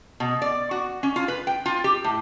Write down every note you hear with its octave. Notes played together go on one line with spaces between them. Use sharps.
B2
D5
F#4
C#4
F4
B4
G5
F4
G4
A2